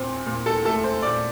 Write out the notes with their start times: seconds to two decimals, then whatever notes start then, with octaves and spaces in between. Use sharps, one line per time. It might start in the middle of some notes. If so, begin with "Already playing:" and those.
Already playing: A#2 C4
0.26 A#2
0.46 A4
0.64 A3 A4
0.84 C5
1.02 A#2 D5